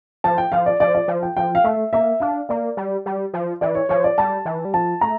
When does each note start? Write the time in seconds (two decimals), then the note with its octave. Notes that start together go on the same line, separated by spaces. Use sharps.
0.24 F3 A5
0.38 G5
0.52 F3 F5
0.66 D5
0.80 F3 D5
0.95 D5
1.08 F3
1.23 G5
1.37 F3 G5
1.55 F5
1.64 A3 E5
1.93 A#3 E5
2.20 D4 F5
2.49 A#3 D5
2.77 G3
3.06 G3
3.34 F3
3.61 E3 D5
3.75 C#5
3.89 F3 C#5
4.04 D5
4.18 G3 A5
4.45 E3
4.65 G3
4.74 F3 A5
5.01 A3 A#5